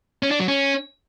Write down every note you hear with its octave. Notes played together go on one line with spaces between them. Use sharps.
C#4
D4
F#3
C#4